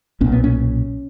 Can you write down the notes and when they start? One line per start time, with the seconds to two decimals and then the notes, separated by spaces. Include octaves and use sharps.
0.21 B1 A#2 C#4
0.32 B3
0.44 C#4